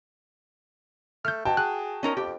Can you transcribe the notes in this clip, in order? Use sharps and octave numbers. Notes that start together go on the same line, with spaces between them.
A3 F6 G6
B2 F#4 G5 A5
G#4 F#6
C#4 D#4 A#4
F2 G4